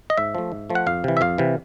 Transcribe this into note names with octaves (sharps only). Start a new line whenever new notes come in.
D#5
G#2 E5
F3 A3
G#2
F3 A3
F#5
F2 F5
C3 E3
E5
F2 F5
C3 E3